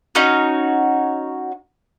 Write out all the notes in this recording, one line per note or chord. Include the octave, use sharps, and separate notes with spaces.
C#4 D#4 F#4 C#5